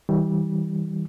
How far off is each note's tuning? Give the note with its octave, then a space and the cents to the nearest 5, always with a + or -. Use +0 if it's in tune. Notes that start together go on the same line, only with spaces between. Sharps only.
E3 -45 G3 -10